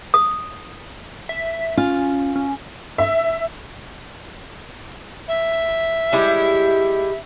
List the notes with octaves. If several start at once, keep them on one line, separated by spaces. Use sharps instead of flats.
D#6
E5
C#4 F4
C#4
E5
E5
G3 G#3 E4